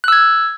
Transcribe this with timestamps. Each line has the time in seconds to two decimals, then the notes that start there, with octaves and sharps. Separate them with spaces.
0.04 F#6
0.08 E6
0.12 G#6